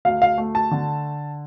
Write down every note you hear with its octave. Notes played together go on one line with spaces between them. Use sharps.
D2 F5
F5
A3
A5
D3